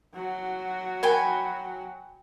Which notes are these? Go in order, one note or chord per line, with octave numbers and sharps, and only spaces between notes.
F#3 F#4
A#4 G5 G#5 B5